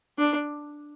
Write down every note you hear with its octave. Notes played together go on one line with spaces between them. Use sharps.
D4